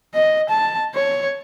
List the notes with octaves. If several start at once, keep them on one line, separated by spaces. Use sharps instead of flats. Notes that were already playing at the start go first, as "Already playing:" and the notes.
D#5
A5
C#5